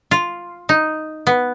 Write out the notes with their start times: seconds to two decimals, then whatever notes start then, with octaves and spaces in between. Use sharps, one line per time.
0.11 F4
0.69 D#4
1.27 B3